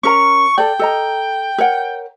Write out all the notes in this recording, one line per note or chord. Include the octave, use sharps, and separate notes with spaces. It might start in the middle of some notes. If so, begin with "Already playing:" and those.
C#4 A#4 A#5 C#6
A4 D5 G5
A4 D#5 A#5
A#4 C#5 F#5